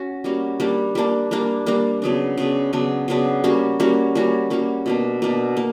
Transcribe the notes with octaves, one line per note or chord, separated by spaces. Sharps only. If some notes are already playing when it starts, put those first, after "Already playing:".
Already playing: C#4 F#4
G3 A#3 C#4 F#4
G3 A#3 D4
G3 A#3 D4
G3 A#3 D4
G3 A#3 D4
C#3 F#3 B3 D4
C#3 F#3 B3 D4
C#3 F#3 B3 D4
C#3 F#3 B3 D4
G3 A#3 C#4 F#4
G3 A#3 C#4 F#4
G3 A#3 C#4 F#4
G3 A#3 C#4 F#4
B2 A#3 D4
B2 A#3 D4
A#3